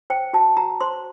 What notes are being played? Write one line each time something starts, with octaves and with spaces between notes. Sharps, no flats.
C5 G5
F#4 A5
F#4 A#5
C5 C6